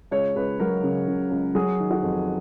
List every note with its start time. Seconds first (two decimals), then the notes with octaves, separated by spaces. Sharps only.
0.11 C#2 C#5
0.35 C#2 B4
0.60 F#3 A#4
0.84 C#3
1.08 C#3
1.31 C#2
1.55 F#3 G#4
1.79 D#3
1.91 F#4
2.03 F2